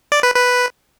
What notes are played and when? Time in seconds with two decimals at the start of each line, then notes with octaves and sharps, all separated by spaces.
0.12 D5
0.23 B4
0.35 B4